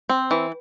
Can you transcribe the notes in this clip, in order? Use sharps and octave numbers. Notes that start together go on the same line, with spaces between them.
C4
E3